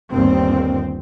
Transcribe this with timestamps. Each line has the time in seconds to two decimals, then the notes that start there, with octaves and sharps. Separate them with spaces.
0.10 G1 D#2 C4